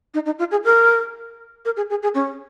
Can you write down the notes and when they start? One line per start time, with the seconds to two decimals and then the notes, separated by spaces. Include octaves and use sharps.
0.14 D#4
0.26 D#4
0.39 F4
0.51 G#4
0.64 A#4
1.65 A#4
1.77 G#4
1.90 G#4
2.03 G#4
2.15 C#4